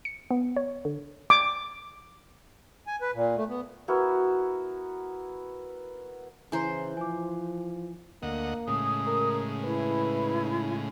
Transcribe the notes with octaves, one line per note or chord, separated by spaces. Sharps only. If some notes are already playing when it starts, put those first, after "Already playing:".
C#7
B3
C#5
D3
D6
G#5
B4
A#2
A3
B3
B3 E4 F#4 A#4
C#3 E3 C5 G#5 A#5 C6
F3 G#5 D6
D2 A#3 D#5 F#5
A2 C#3 G#3 D#6
A#4
E4 B4